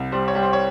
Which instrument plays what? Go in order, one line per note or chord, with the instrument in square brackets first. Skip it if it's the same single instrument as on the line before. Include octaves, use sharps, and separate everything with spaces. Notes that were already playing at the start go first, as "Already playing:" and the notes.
Already playing: [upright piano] C2
G3 C5
C#5
G3
C5
C#5